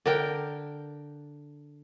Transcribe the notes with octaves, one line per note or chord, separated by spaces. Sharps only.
D3 A#4 G5